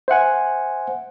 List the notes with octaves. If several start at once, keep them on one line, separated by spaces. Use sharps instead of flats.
C5 E5 F#5 G#5